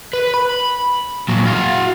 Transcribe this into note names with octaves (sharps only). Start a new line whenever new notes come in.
B4
B5
A#2 F#3
F#4 F5